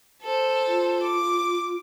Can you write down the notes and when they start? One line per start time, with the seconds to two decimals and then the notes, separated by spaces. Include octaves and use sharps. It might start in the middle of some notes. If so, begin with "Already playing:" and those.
0.22 A4 C5
0.68 F4
1.03 D6